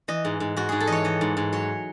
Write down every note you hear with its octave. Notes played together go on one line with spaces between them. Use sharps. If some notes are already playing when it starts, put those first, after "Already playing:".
E3 D#5
G#2
G#2
G#2 F#4
G#2 G#4
A4
E3 C#5 D#5
E3 D#5
G#2
G#2
F#3 C#5